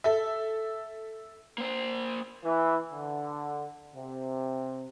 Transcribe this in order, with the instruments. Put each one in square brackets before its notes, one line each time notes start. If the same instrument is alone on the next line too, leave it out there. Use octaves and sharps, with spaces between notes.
[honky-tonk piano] A4 E5
[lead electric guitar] A#3 C5
[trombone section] E3
D3
C3